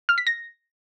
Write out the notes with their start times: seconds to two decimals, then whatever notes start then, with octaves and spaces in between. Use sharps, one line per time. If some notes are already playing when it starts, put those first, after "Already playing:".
0.09 F6
0.18 B6
0.27 A#6